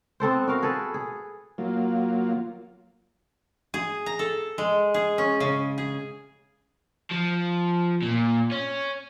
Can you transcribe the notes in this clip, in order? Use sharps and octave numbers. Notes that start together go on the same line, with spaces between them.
B3 C4 A4 C5
F#4 A#4 F5
G#4 A4 B4
G#4
F#3 A#3 F4
G#4
A#5
A4
G#3
G#4
C#4
C#3
G#4
F3
A#2
C#4